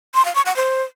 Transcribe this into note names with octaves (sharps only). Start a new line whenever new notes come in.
C6
F5
C#6
F#5
C5